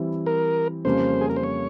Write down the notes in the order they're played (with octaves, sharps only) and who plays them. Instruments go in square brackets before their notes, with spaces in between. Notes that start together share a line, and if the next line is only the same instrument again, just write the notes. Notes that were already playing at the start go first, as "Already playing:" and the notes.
Already playing: [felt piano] E3 G3 C4 E4
[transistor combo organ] A#4
[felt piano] F2 C#3 G3 A#3 C#4 [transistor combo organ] C5
[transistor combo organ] G#4
A#4
C5
C#5